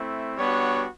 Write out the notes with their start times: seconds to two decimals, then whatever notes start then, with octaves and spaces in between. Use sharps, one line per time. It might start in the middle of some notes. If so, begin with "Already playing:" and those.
Already playing: A3 C4 E4
0.38 G3 B3 D4 F#4 C#5